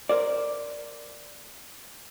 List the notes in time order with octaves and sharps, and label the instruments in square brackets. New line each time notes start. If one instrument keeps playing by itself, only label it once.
[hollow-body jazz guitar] A#4 C5 D5